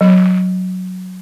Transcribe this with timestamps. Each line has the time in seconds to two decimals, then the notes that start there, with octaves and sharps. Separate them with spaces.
0.01 F#3